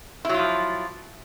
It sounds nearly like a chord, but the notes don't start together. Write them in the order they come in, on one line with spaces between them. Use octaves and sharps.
E4 F#3 F4 F3